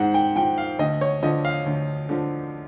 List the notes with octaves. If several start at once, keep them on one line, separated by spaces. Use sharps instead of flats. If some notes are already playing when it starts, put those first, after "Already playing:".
Already playing: G#2 C5 F#5
G5
F3 G5
F5
D2 D#5
C#5
D3 F3 D#5
F5
D2
D3 F3